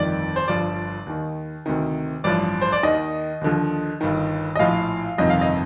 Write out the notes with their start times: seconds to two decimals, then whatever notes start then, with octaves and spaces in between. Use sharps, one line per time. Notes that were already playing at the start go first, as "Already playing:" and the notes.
Already playing: G1 F2 D#3 D5
0.36 C5
0.48 G1 G2 F3 D5
1.06 D#2 D#3
1.66 D2 C3 D#3
2.24 A1 G2 F3 D5
2.61 C5
2.72 D5
2.83 D#2 D#3 D#5
3.41 D#2 D3 F3
4.01 G1 G2 D#3
4.56 D#5
4.59 A#1 A2 F3 F5
5.18 G1 F2 C3 D#3 D#5
5.30 F5
5.41 D#5